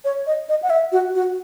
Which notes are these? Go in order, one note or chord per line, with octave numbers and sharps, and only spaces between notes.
C#5
D#5
D#5
F#5
E5
F#4
F#4